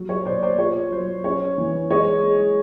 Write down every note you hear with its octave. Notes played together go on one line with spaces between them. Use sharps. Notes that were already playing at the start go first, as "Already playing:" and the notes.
Already playing: F#3
C#5
B2 C5 D5
C5 D5
F4 C#5
F#3 C5
C#4 C#5
E3
G#3 C#5 D#5
G#3